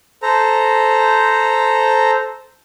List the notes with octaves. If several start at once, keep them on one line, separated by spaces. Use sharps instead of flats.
A4 C5 A#5